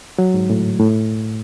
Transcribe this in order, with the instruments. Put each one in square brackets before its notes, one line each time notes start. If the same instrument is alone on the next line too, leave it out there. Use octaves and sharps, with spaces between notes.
[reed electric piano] F#3
G#2
A2
A2